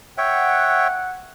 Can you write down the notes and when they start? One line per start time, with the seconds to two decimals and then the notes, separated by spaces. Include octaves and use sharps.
0.18 C#5 E5 F#5 G5